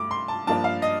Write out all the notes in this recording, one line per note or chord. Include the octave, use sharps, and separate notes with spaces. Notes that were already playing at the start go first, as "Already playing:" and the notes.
Already playing: G2 A3 D6
C6
A5
G2 F3 A#3 D4 A5
F5
D#5